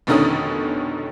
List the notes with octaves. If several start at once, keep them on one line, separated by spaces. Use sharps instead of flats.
F1 B2 D3 D#3 C#4 D#6